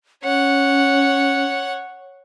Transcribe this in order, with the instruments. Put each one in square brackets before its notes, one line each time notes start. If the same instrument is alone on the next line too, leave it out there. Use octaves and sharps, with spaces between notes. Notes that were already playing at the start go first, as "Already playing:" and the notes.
[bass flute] C#4 [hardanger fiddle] C#5 F#5